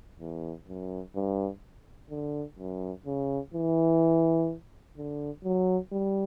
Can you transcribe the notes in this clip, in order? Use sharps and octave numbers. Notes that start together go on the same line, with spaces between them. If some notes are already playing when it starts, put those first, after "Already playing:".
E2
F#2
G2
D3
F#2
C#3
E3
D3
F#3
G3